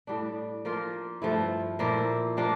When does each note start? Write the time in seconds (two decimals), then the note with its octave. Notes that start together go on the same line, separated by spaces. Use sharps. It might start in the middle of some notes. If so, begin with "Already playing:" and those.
0.07 A2 G3 D4
0.65 F3 A#3 F4 A#4
1.22 G2 F3 A3 E4
1.79 A#2 F3 A#3 E4
2.37 F3 A#3 D4 G4